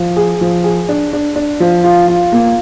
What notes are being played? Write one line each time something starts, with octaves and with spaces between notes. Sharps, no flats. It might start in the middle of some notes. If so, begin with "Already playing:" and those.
Already playing: F3
G#4
F3
G#4
D4
D4
D4
F3
F4
F4
A#3